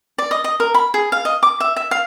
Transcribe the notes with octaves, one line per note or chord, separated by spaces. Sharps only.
D5
D#5
D#5
A#4
B5
G#4
F5
D#5
D6
E5
E5
F5